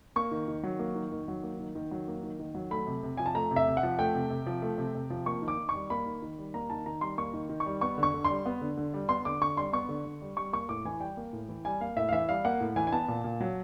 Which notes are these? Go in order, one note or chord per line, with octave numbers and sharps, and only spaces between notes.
A#3 C#6
D#3
D#3
F#3
A#3
D#3
D#3
F#3
A#3
D#3
D#3
F#3
A#3
D#3
D#3
F#3
A3 B5
C3
C3
F3 G#5
A5
A3 A#5
C3
E5
C3
F#5
F3
A3 G5
C3
C3
F3
A3
C3
C3
F3
A#3 C#6
D#3
D6
D#3
C#6
G3
A#3 B5
D#3
D#3
G3
A#3 A#5
D#3 A5
D#3 A#5
G3 C6
A#3 C#6
D#3
D#3
C#6
G3
B3 C#6
D3
C#6
D3
C6
G3
B3
D3
D3
G3
B3 C6
D3 D6
D3 C#6
G3 C6
B3 C#6
D3
D3
G3
G3 C#6
A#3 C#6
A2 D6
E3 G#5
G3 G5
A#3
A2
E3
G3 G#5
A#3 F5
A2 E5
F5
E3 E5
G3 F5
A#3 F#5
A2
E3 G#5
G#5
B3 A5
A#2
A#2
F#3